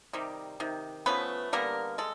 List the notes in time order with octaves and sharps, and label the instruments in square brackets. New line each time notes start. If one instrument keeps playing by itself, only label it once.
[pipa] C3 D#3 G3
C3 D#3
F3 A3 B3 C#4 B4
D3 G3 A#3 B3 A#4
G#3 A4